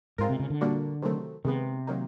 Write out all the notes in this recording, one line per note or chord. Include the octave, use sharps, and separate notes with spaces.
G#2 G#3 C4 F4 A#4
C3
C#3
D3
A#2 G3 A#3 D4 F#4
C3 D#3 F#3 A3 C4
C3 D#3 G#3 B3
D#3 F#3 A#3 D#4